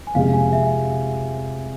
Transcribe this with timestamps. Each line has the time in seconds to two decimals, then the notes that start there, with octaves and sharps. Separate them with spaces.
0.07 G#5
0.14 F2 C3 G#3 F5
0.34 G#5
0.53 E5